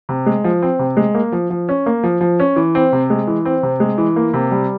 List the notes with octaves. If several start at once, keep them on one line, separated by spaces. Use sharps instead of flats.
C3
G#3
F3
C4
C3
G#3
A#3
F3
F3
C#4
A#3
F3
F3
C#4
E3
C4
C3
G#3
E3
C4
C3
G#3
E3
A#3
C3
G3